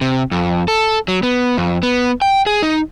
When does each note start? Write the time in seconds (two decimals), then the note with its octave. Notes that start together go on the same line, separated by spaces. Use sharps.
0.01 C3
0.31 F2
0.68 A4
1.08 F#3
1.23 B3
1.57 F2
1.83 B3
2.22 G5
2.46 G#4
2.63 D#4